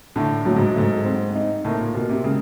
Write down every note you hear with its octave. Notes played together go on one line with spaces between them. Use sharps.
A2 D3
A2 F#3
G#2
G#2 A3
C4
D#4
A2 A#3
A#2
B2 A#3
C3
C#3 G#3